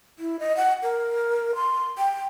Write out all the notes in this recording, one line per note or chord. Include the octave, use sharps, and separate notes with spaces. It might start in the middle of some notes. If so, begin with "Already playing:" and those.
E4
D#5
F#5
A#4
C6
G5